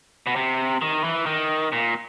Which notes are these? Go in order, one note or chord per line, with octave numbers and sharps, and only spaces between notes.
B2
C3
D#3
E3
D#3
A#2